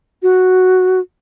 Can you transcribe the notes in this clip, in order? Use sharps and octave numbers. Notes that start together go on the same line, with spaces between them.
F#4